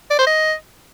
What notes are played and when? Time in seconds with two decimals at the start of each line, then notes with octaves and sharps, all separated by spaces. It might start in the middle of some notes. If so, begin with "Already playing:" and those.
0.11 D5
0.19 C5
0.27 D#5